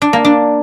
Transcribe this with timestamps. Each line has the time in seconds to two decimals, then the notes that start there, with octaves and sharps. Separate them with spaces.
0.02 D4
0.13 A#3
0.25 D4